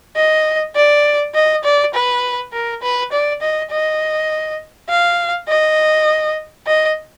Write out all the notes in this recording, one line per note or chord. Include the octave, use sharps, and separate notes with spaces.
D#5
D5
D#5
D5
B4
A#4
B4
D5
D#5
D#5
F5
D#5
D#5